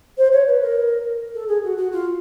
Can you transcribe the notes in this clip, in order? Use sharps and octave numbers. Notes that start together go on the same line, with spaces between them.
C5
C#5
B4
A#4
A4
G#4
F#4
F#4
F4